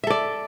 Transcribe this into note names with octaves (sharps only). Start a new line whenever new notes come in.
A4 D5 E5